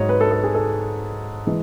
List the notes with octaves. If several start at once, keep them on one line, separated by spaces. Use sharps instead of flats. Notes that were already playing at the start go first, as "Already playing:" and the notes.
Already playing: G#2 F#3 C#5 D#5
B4
A4
A4
G#4
A4
E3 G#3